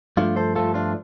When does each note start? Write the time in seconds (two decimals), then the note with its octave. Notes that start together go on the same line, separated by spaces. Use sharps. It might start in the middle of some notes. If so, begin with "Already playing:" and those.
0.17 G2 F3 A3 D4 F4
0.36 A4 C5
0.55 G2 F3 A3 F4 A4
0.74 D4 F4